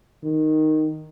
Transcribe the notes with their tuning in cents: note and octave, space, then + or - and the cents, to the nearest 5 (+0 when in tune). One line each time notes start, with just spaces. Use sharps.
D#3 -5